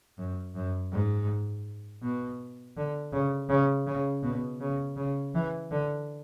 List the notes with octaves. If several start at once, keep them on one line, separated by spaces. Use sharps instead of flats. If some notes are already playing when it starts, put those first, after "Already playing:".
F#2
F#2
G#2
B2
D3
C#3
C#3
C#3
B2
C#3
C#3
E3
D3